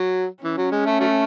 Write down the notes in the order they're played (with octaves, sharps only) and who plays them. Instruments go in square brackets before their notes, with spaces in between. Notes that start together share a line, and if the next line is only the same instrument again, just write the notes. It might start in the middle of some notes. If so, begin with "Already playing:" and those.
Already playing: [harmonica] F#3
[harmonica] E3 [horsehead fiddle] C#4
[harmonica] F#3
G#3
A3
F#3 A3